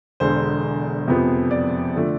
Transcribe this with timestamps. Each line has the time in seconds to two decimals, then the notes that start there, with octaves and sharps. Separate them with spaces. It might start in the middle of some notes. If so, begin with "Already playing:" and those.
0.20 E1 E2 D3 C5
1.08 F2 C3 F3 B3
1.51 D5
1.96 D3 F3 A3